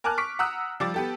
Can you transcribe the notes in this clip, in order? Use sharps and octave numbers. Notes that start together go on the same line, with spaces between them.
A#4 G#5 A5 D6 F6 F#6
C#6 D6 B6 D7
F#5 A#5 D#6 E6 F#6
F3 G3 D6 A6
B3 G4 A4